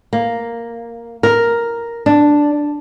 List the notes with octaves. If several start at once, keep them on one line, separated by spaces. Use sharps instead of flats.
A#3
A#4
D4